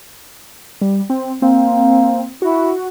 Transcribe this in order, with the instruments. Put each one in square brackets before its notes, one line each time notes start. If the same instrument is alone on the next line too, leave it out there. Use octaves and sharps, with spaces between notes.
[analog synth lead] G3
C4
[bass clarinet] A#3 [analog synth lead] C4
[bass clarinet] E4 [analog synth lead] F#4